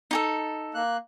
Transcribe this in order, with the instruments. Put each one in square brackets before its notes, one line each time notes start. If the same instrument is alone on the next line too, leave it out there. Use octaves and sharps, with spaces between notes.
[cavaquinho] D#4 G4 A4
[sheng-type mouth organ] A#3 F#6